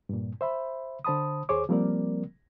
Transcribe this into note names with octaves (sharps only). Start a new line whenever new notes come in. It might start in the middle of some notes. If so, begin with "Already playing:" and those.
G2 A#2
C5 E5 B5
D3 C5 A5 B5 D#6
D#2 G#4 C5 C#5 D6
F3 G3 A#3 C4 A#4 D5